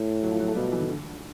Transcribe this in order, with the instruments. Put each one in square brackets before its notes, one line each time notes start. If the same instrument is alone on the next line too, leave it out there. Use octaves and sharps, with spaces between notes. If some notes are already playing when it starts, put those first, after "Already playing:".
Already playing: [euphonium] A2
[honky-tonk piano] F#3
F3
F#3
A3
[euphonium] B2 [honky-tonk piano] G3
[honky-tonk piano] F3
E3
D#3
D3